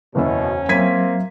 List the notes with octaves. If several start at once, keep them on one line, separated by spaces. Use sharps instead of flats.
F#1 E2 B2 C#4 E5
F#3 A#3 C4 E5 G#6 B6 D#7